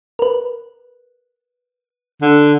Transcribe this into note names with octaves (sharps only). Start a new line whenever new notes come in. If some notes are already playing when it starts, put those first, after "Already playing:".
A#4 B4
D3